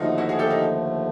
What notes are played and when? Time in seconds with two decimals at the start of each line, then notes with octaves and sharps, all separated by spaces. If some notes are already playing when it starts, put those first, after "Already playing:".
Already playing: D#2 D3 F3 A3 D#4 F4 F#4
0.18 E4 F#4
0.29 F#4 G#4
0.39 G4 A4
0.50 D#4